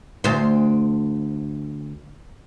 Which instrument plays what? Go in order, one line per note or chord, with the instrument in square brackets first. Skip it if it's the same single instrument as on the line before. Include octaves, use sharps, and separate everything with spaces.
[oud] D2 C5